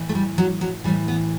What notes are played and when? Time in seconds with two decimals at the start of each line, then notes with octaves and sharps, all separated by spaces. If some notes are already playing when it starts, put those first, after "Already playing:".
Already playing: A2 E3
0.09 A3
0.15 G3
0.38 F#3
0.61 F#3
0.84 E3 G3
0.88 A2
1.08 B3